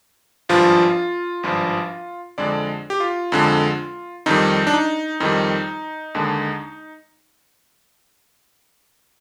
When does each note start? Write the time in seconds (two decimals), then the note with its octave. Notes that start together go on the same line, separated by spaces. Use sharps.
0.49 G#1 G2 F3 F4
1.43 G#1 G2 F3
2.38 F2 D3 G#3 D5
2.90 G4
3.00 F4
3.32 F2 D3 G#3
4.26 F2 D#3 G3 D#4
4.67 D4
4.74 D#4
5.20 F2 D#3 G3 D#4
6.15 D#2 D3 G#3